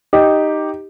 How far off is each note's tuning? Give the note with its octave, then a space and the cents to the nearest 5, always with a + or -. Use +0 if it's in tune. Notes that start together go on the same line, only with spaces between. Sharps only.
D#4 +0 G4 +0